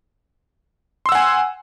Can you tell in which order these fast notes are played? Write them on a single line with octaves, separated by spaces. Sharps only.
C6 E6 F#5 G#5